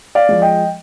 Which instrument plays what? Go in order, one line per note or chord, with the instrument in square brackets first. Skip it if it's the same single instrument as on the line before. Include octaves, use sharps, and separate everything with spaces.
[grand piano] D5 F5
F3 G#3
D#5 G5